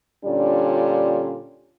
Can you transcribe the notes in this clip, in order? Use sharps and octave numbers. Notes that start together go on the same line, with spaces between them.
A#2 D3 G3 C#4 D4 F4